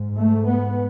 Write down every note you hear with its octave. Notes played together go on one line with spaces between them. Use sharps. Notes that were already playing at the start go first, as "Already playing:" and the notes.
Already playing: G#2
A3
B3